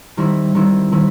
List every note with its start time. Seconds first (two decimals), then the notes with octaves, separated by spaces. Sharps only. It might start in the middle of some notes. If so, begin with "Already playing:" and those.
0.17 D#3 G3 C4 E4
0.54 D#3 G3 C4 E4
0.92 D#3 G3 C4 E4